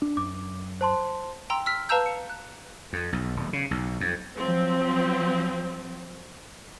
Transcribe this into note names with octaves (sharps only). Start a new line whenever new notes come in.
D4
F#2 D6
C5 A5 C6
G5 A#5 C6 E6
E6 F6 B6
B4 F5 A5 A#5 E6 G6
C#7
F#6
F2
B1
D#1
C#3
B1
F2
F3 F#3 C4